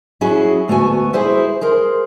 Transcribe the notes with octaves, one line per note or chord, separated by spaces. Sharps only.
F#3 C#4 E4 F#4 G#4
D2 A3 B3 F#4 G#5
E4 G#4 B4 C5 E5
G#4 A#4 C5